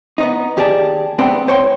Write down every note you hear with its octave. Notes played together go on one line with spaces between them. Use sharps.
B3 C#4 D#4
D#2 G4 G#4 D5 A5
G#2 C3 B3 C4 D4 G5
C2 C5 C#5 G5 C6